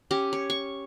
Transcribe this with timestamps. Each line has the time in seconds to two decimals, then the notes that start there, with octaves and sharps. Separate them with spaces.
0.11 C#4 G4
0.33 C#5
0.50 C#6